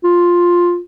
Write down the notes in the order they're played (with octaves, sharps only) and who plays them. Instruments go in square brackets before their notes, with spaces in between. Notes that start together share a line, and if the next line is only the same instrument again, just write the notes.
[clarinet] F4